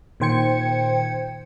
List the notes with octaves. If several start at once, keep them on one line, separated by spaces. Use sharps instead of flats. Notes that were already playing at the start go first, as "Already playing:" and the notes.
A#2 D#3 C5 G5 G#6 C#7